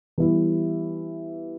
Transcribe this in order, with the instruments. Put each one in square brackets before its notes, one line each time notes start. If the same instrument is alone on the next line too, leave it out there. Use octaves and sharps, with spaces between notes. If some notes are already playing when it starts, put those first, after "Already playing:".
[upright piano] E3 G3 B3 E4